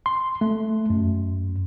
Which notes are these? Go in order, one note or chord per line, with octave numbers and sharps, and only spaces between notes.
C6
A3
F#2